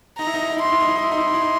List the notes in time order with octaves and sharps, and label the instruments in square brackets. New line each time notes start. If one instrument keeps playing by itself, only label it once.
[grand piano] D#4 [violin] A#5
[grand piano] E4
D#4
E4
D#4
E4
[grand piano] D#4 [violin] C6
[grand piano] E4
D#4
E4
D#4
[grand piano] E4 [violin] C6
[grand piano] D#4
E4
D#4
E4
D#4